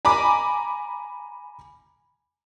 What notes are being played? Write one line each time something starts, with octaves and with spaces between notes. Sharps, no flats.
G#5 A#5 B5 D6